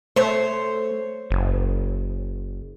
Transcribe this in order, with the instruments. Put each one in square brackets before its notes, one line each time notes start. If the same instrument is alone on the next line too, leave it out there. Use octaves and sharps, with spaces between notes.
[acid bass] A3 [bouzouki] C5 C#5
[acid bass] F#1